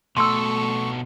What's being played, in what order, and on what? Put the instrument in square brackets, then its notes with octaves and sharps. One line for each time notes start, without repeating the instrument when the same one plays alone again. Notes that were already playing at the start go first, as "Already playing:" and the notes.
[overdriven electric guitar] B2 A4 [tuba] A3 [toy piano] C6 E6 [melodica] C#6